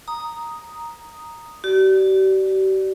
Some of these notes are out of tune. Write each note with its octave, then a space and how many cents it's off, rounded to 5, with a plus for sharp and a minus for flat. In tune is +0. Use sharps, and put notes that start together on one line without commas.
A#5 +0 D#6 +0
G4 -45 D5 +0